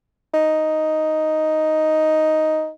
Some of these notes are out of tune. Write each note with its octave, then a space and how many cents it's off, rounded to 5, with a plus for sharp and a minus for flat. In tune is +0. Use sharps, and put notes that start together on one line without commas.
D#4 +5